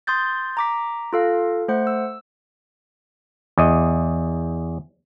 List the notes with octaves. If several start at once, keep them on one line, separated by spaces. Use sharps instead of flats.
C6 D#6 G6 A6
A#5 D6 B6
F4 A4 F5
A3 C5 F#5
E6
E2 D#5